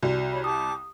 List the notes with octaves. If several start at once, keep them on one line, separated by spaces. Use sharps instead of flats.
C2 F#4 D5
C#5 B5
G4 A5 D6 D#6